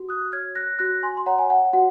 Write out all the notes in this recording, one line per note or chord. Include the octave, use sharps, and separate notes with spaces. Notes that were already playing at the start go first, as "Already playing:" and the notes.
Already playing: F#4
D#6 F#6
C#5 F6 G#6
F#6 A#6
F#4 F#6 A#6
G#5 C6
C6
C#5 F#5 A#5
G#5
F#5
F#4 F#5